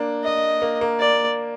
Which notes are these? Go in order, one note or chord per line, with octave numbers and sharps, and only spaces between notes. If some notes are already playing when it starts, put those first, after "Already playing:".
Already playing: A#3 D4
D#5
A#3
A#3
D5